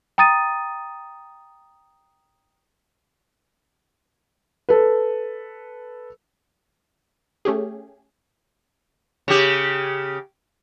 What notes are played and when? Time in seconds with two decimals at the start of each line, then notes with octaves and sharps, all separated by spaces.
0.18 G5 A#5 D#6 A6 D#7
4.69 A4 B4
7.45 A3 C#4 G4 G#4
9.28 C#3 G4